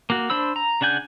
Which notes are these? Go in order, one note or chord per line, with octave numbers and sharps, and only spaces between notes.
A#3 F#4
D4 C5 B5 E6
A#5
C#3 D4 F#5 G#5 G6